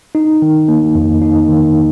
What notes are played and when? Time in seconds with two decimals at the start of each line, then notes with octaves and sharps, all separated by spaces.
0.15 D#4
0.42 D#3
0.68 A#3
0.95 F2
1.22 D#4
1.49 D#3